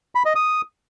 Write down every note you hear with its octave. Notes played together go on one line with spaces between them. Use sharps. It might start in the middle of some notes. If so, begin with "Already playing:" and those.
B5
D#5
D#6